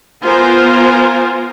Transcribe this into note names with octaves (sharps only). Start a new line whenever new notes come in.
B3 F4 A#4 C5 G#5